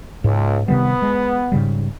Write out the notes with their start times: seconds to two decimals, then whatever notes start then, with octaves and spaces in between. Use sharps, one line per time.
0.24 C#2 G#2
0.68 C3 D#3 G3 B3
1.02 G#3
1.52 G#2 C#3 G3